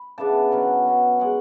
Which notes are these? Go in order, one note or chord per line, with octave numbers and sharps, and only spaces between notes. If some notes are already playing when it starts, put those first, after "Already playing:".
Already playing: B5
C#3 E3 B3 D4 A5
B2 F#3 C#4 A5
B2 F#3 C#4
G#3 C#4 F#5